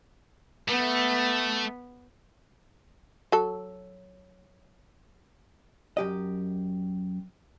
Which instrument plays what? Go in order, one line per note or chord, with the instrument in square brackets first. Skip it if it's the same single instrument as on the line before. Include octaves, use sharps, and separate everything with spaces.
[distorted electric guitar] A3 [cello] B3
[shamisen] F#3 A4
[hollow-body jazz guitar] F#2 G4 D#5